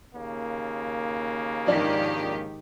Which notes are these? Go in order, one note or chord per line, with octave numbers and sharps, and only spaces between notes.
D#2 C#3 A#3
G#2 D#3 F3 D4 G4